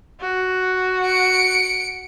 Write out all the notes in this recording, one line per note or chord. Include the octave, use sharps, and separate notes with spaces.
F#4
C#7 D7